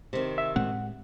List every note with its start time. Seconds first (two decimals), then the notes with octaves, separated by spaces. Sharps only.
0.13 C3 D#3
0.38 E5
0.56 A2 G#3 C4 F#5